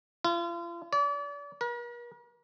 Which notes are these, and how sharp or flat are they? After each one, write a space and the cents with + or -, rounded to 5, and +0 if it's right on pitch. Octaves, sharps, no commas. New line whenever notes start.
F4 -40
D5 -40
A#4 +45